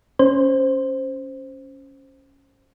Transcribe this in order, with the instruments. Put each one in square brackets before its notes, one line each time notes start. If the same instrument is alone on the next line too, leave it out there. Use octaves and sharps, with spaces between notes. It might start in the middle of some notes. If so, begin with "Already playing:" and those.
[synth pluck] C#4 C5